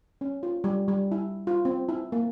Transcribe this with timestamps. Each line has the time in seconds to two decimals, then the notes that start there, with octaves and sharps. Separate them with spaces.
0.21 C#4
0.43 F4
0.64 G3
0.88 G3
1.12 E4
1.47 F4
1.65 C4
1.89 E4
2.12 A#3